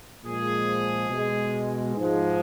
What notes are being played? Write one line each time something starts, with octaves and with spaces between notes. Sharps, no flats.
A#2 F3 G#3 G#4
B2 G#3
G#2 F3 G#3